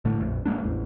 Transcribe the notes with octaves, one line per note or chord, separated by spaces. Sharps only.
A2 D3 A3
A#1 F2
D1 G#3 A#3 D4
A1 E2